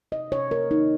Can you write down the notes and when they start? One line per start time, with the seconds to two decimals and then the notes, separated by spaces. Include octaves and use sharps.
0.12 C3 D#5
0.32 C3 C#5
0.51 C3 A#4
0.71 A#3 D#4